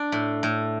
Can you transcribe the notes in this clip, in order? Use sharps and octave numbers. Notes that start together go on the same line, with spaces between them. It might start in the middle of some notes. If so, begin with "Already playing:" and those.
Already playing: D4
A2
A2